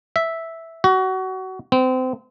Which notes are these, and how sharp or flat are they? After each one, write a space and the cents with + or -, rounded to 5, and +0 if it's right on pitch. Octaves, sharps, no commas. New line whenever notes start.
E5 -5
F#4 +25
C4 -30